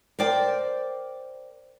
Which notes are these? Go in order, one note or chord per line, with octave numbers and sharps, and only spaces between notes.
A#4 C5 D5 G5